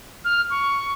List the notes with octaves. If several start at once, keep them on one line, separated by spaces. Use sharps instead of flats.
F6
C#6